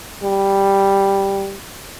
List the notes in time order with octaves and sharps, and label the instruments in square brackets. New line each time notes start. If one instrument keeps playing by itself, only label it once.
[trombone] G3